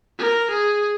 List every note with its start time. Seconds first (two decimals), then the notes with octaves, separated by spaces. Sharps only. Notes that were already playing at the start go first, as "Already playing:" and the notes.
0.18 A#4
0.51 G#4